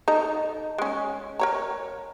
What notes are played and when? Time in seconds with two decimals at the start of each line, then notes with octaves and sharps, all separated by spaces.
0.08 D#4 A4 A#5
0.78 G#3 C#4
1.39 A#4 C#5 A#5